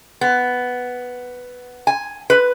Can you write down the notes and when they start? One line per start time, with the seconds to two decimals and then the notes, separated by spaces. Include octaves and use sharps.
0.21 B3
1.87 G#5
2.30 B4